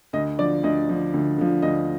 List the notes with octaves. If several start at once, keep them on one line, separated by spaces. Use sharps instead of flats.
D2 D#5
D3 F3 D5
D2 D#5
D3 F3
D2
D3 F3
D2 D#5